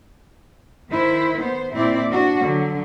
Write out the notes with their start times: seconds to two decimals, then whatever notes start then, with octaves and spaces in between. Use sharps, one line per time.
0.91 D#3 E4 C5
1.38 B3 C5
1.71 A#2 C4 E4 D5
2.09 D4 F#4
2.41 D3 F#3